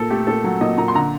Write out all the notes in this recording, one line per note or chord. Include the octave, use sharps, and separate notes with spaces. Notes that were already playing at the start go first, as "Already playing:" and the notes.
Already playing: A#2 A4
A3 G4
A#2 A4
F#3
A#2 D#5
A#2 A#5
C6
D3 A#5